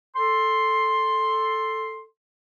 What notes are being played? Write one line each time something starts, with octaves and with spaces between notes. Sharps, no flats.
A4 C6